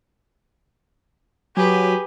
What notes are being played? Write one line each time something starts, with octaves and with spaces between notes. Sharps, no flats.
F#3 G4 G#4 B4